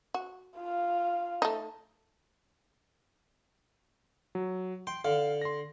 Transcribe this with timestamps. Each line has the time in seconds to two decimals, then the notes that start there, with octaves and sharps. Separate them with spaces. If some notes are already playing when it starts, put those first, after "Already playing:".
0.14 F#4
0.58 F4 F5
1.42 A3 D#4
4.35 F#3
4.87 G5 C6
5.05 D3 F5
5.42 C6 A#6